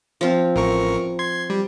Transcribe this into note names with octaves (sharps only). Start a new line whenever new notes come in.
F3 C4 F4
A1 A#4 C#6
C6 G#6
G3